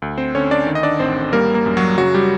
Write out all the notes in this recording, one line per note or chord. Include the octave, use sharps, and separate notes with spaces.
D2
C4 C5
D3 C#4 C#5
D4 D5
D#3
D#5
D4 D5
A1 C4 C5
G3 A#3 A#4
A#3 A#4
F#2
F#3 F#4
C#3 F#3 F#4
G3 G4